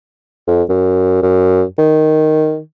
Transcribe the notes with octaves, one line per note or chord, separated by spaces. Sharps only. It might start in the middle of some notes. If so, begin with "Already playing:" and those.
F2
F#2
F#2
D#3